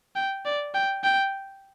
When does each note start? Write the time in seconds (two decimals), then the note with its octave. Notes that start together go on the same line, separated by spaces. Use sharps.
0.16 G5
0.45 D5
0.74 G5
1.04 G5